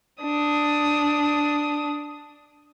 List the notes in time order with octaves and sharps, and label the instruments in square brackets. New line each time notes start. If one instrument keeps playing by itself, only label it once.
[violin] D4 D#6